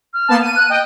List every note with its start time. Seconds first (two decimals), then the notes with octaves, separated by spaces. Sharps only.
0.14 F6
0.28 A#3 B3 A5
0.42 D#7
0.56 F#6
0.70 D#5 G5